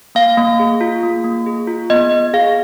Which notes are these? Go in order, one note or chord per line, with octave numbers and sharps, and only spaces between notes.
A#3 F5
A#3
G#4
F4
A#3
A#3
G#4
F4
B3 D#5
B3
G#4 F5